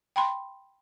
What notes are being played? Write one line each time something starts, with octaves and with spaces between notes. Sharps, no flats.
G5 B5 C6